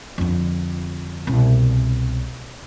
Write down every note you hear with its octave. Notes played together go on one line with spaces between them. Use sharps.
F2 D3
C2 B2